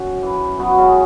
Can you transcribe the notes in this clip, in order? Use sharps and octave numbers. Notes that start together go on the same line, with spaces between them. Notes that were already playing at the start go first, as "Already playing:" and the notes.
Already playing: F#2
E3
B2 F#3 B3
C#3 C#4